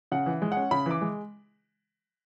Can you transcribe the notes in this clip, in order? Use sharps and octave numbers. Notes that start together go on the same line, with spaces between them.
C#3 F#5
E3
G#3
F#5
C#4
C#3 B5
E3 D6
G#3